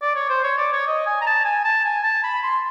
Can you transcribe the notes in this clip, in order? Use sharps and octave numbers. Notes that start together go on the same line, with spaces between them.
D5
C#5
C5
C#5
D5
C#5
D#5
G#5
A#5
A5
G#5
A5
G#5
A5
B5
C6